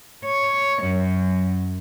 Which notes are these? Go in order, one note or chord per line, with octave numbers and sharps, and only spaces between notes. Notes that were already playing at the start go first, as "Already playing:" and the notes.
C#5
F#2